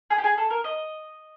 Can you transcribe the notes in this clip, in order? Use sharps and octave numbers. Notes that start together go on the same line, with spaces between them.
G#4
G4
G#4
A4
A#4
D#5